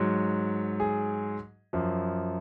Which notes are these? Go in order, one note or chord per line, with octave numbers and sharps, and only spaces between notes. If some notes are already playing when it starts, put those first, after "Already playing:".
Already playing: G#2 F#3
G#4
F#2 F3